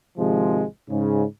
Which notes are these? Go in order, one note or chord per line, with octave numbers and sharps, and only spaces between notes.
G#1 C3 F3 G#3
G#2 C#3